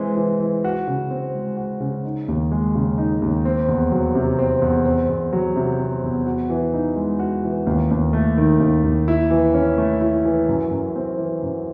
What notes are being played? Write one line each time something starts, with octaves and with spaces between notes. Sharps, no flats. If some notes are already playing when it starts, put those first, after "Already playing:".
Already playing: E3 G#3 C4
E3
E3
F#4
C#3
C4
G#3
F#4
C#3
D#4
D#2
G#3
C#3
D#4
D#2
C4
E2
F#3
C3
C4
E2
C4
E2
F#3
C3
C4
E2
F#4
E3
D#4
G#3
F#4
E3
D#2
D#2
A3
D#3
D#2
D#2
E4
E3
C#4
A3
E4
E3
F#2
F#2
C4
E3
F#2